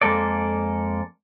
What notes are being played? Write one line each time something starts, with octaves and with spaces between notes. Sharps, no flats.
F2 G#3 A#3 A4 D5